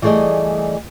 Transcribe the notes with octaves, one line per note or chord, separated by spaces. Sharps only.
E3 G3 A3 G#4 D5 D#5